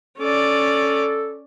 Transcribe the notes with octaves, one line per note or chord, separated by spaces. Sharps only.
C#4 A4 D5